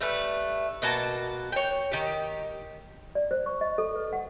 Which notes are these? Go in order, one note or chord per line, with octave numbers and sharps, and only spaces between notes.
G3 A3 B4
B2 A#3 F#4 A5
C#5 G5
D#3 G4
D5
C5
C#6
D#5
A4
B4
F#5